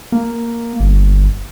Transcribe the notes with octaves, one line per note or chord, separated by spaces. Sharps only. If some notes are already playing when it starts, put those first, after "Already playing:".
A#3
G1